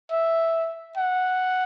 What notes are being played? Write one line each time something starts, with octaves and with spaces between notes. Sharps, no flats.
E5
F#5